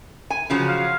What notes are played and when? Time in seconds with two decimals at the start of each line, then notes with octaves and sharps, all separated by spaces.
0.30 G#5
0.50 C#3 F3 F#3
0.68 F5